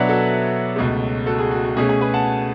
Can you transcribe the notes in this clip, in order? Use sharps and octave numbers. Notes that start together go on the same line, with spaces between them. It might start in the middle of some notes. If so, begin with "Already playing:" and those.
Already playing: B2 F#3 B3 D4 C#5 D5 E5 F#5
F#4 A4
C#2 B2 A3
F#4 A4
G#4
F#4
F#4
B2 A3 C#4 G#4
G#4
G#4 B4
F#5 A5